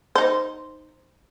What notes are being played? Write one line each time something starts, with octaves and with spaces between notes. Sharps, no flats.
D#4 C5